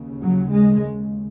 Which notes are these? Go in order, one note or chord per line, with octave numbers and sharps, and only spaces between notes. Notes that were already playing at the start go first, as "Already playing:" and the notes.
Already playing: D#2 C#3
F#3
G#3